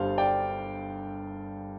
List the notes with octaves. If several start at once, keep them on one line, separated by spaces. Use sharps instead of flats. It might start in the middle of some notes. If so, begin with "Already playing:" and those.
Already playing: G1 G2 G3 C5 F5
D5 G5